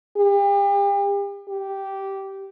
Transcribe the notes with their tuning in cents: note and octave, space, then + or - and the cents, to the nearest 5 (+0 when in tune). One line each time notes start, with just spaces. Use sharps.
G4 +40
G4 -10